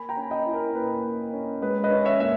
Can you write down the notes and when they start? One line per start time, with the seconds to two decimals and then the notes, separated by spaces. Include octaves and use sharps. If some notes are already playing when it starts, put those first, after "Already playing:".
Already playing: A#3 G#5 B5
0.09 G5 A#5
0.17 C#4
0.31 D#5 G5
0.46 E4
0.53 A#4
0.75 A#2 B4
1.04 A#3
1.33 C#4
1.62 G#3 B4
1.84 B4 D#5
1.91 C#4
2.05 C#5 E5
2.20 A#2 E5